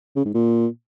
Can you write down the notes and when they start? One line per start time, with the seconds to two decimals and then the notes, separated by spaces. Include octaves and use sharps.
0.16 C#3
0.25 G#2
0.34 A#2